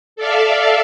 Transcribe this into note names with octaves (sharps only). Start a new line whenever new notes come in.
A4 D5 E5 F5